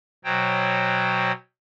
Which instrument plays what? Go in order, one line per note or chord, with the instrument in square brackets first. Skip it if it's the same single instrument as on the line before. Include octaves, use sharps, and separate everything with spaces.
[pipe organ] B2 F#3 C5 C#5 G5